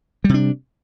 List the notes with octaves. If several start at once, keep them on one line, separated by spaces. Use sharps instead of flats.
C3 G3 D4